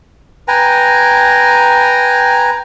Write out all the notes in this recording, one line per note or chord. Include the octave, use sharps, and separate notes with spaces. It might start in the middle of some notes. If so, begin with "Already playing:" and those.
B4 G5 G#5 A#5